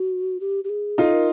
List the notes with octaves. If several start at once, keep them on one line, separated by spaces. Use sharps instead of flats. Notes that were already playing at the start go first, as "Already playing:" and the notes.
Already playing: F#4
G4
G4
G#4
D#4 F4 A4
A#4